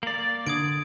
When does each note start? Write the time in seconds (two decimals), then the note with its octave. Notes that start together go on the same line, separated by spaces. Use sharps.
0.03 A#3 D5
0.47 D3 D#6 G#6 D7